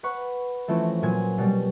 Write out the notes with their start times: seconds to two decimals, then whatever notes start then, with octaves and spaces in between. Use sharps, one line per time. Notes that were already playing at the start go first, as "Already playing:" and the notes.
0.03 B4 F#5 B5 C#6
0.68 E3 F3 A3 C4 C#4
1.02 A#2 F#3 G#5 G#6
1.38 B2 G3